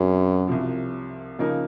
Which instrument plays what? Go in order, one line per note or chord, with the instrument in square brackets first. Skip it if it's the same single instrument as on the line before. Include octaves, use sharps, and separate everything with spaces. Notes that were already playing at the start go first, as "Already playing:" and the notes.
Already playing: [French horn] F#2 [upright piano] C3 F#3 C#4 G#4
[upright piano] C2 C3 F3
C#3 F3 A#3 D#4 A#4